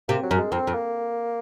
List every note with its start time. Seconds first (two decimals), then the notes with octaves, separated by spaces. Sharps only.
0.09 C3 A#3
0.23 F#3
0.31 F#2
0.38 G#3
0.52 F2 C4
0.67 F2
0.74 A#3